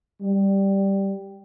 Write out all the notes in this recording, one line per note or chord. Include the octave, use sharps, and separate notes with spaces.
G3